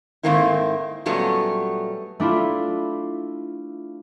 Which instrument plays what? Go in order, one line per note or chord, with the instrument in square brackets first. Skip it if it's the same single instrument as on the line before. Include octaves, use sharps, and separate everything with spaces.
[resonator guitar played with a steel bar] G#2 D#3 A3 A#3 C4 E4
A#2 F#3 G3 A3 B3 C#4
[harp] A3 D4 E4 F4